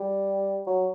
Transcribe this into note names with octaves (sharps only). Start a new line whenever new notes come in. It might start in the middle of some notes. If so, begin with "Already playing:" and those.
Already playing: G3
F#3